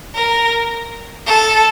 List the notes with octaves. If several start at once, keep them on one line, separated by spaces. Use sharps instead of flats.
A#4
A4